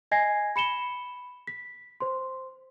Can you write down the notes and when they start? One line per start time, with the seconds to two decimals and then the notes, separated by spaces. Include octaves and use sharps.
0.11 D#5 G#5 G#6 A#6 C7
0.56 B5 C#7 E7 G7
1.47 B6
2.00 C5 C6